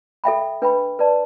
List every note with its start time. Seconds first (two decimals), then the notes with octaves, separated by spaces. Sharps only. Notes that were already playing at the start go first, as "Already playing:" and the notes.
0.24 A4 E5 G5 B5
0.62 D4 B4 G5 B5
0.99 B4 D5 A5